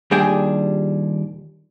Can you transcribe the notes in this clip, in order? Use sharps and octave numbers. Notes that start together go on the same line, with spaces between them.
D#2 A#2 G3 D4 G#4 G5